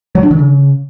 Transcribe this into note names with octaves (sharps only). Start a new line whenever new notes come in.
F#3
D4
D#3
C#3